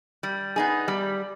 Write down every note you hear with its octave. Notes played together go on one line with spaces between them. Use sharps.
G3
B3 D#4 G#4
G3